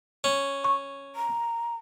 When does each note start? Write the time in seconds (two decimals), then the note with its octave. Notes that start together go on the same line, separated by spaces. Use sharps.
0.24 C#4
0.64 C#6
1.16 A#5